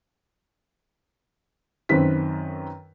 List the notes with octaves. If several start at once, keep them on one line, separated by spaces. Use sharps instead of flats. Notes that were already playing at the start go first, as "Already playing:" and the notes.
F#2 D#3 C4 B4 B6